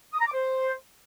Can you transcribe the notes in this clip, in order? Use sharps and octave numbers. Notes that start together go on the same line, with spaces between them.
D#6
A#5
D6
C5